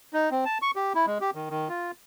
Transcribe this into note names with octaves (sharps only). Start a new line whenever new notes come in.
D#4
C4
A5
C#6
G4
E4
G#3
G4
D#3
D#3
F4